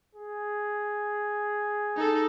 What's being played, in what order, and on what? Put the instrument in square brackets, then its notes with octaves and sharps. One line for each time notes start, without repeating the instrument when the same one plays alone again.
[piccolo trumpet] G#4
[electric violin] D#4 A4